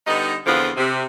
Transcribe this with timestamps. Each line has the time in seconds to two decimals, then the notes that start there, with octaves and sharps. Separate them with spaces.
0.06 D3 G3 B3 D#4
0.46 E2 D3 F3 B3 C4 F4
0.77 C3